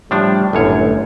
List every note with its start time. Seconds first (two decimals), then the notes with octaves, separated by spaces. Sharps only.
0.11 A2 F3 G3 D4
0.53 G1 F#2 A2 C#5